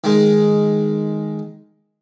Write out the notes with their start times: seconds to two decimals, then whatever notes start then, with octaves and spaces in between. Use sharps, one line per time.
0.04 D#3 G#3